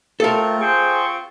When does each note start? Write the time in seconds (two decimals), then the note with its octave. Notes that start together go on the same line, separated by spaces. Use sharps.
0.20 A3 C4 F4 A4 A#4
0.61 G#4 C5 G5 C#6